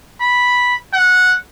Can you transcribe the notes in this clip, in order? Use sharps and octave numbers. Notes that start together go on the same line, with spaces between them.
B5
F#5